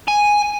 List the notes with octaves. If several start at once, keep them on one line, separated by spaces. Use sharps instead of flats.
G#5